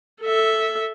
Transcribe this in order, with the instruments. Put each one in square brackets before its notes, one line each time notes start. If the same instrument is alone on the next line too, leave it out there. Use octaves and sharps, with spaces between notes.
[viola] A4 E5